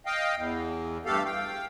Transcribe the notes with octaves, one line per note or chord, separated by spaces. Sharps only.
D#5 F5 G5
E2
G2 A3 G4 A4 F5
F5 G5